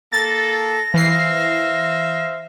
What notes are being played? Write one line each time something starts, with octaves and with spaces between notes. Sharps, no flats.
A#3 A4 A6 A#6
E3 C5 E5 F5 C7